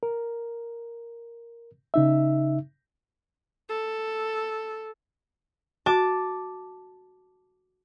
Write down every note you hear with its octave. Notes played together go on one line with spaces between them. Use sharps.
A#4
C#3 D#4 E5
A4
F#4 A5 D6